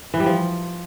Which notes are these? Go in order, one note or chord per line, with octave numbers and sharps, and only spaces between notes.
E3
G3
F3